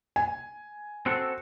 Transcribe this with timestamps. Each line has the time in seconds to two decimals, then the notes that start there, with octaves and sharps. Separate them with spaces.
0.16 G#5
1.06 C4 F#4 A4